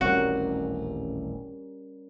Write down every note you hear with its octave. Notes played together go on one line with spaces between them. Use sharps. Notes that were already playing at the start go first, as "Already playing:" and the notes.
D#1 A1 G3 C4 C#4 F#4 A#4